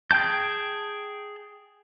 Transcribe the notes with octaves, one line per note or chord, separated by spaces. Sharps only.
G#4 G5 A5 G6